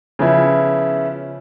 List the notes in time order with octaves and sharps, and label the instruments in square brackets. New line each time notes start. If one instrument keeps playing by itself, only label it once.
[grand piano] C#3 F3 B3 E4